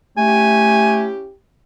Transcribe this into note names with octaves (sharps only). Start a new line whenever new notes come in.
A3 C#4 E4 G4 G#5